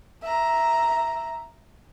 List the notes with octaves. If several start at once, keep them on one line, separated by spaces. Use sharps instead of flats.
E5 A#5